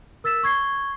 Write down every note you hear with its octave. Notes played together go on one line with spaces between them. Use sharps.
A#4 E6 A6 B6 E7
C#6 G#6 C7 G7